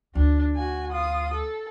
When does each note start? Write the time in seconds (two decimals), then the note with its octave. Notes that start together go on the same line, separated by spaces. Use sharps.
0.15 D2 D4
0.56 F#4 G#5
0.92 F4 D#6
1.33 A4